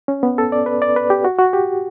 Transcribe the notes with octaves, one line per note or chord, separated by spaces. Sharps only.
C#4
B3
A4
D5
B4
D5
B4
G4
F#4
F#4
G4